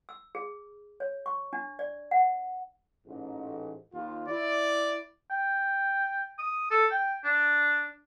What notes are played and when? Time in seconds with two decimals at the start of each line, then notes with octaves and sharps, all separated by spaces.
0.09 E6
0.35 G#4
1.00 C#5
1.26 C#6
1.53 D4
1.79 D5
2.11 F#5
3.05 A1 G#2
3.92 D#2 F4
4.28 E4 D5
5.30 G5
6.38 D#6
6.71 A4
6.91 G5
7.24 D4